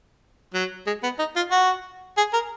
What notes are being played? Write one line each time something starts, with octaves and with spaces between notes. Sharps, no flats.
F#3
G#3
B3
D#4
F4
F#4
G#4
A#4